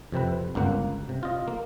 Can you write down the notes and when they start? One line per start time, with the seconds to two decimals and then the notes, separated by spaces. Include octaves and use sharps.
0.12 F2 C3 C4 B4
0.55 G1 C#2 A#3 F#5
1.09 C3
1.23 F4 D#5
1.48 A#3